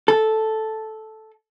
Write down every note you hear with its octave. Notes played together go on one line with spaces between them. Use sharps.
A4